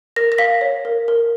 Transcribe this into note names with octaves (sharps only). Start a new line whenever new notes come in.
A#4 A#6
A#6
F5 B6
C#5
A#4
A#4